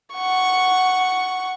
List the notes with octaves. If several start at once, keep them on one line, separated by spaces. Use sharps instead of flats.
F#5 C#6